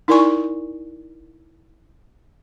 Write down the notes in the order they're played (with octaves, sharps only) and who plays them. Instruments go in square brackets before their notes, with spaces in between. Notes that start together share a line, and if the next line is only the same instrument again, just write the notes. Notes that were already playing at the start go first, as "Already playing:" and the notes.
[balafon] D#4 E4 A#4 D5 G#5 C#6